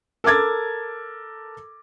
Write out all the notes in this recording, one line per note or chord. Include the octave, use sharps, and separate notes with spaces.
A4 A#4 D6 G#6 A6